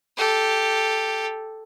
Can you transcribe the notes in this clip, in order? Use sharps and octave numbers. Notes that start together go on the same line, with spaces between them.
G4 A4